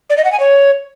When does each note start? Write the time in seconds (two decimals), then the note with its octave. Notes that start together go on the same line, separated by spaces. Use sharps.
0.10 D5
0.17 D#5
0.25 F#5
0.32 G#5
0.40 C#5